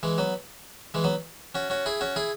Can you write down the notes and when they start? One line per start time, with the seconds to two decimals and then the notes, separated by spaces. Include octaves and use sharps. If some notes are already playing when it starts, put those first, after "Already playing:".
0.03 E3 G#3
0.18 F#3 B3
0.94 E3 G#3
1.04 F#3 B3
1.55 C#4 F#4
1.70 C#4 F#4
1.86 E4 G#4
2.01 C#4 F#4
2.16 E4 G#4